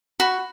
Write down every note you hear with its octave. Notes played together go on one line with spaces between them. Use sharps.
F#4 B5